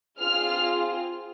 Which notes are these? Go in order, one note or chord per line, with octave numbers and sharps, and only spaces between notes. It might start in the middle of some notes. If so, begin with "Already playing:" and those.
C4 F4 G#4 F6